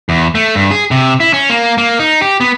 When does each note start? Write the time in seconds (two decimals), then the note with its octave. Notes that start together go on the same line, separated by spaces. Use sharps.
0.09 E2
0.35 A3
0.55 G2
0.71 G#4
0.91 C3
1.20 E4
1.33 C#4
1.50 A#3
1.78 A#3
1.99 D#4
2.21 G4
2.40 B3